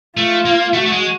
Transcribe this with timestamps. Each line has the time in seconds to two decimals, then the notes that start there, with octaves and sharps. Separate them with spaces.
0.17 A3 F4
0.46 A#3
0.74 A3 F#4
0.86 A3
0.92 G#3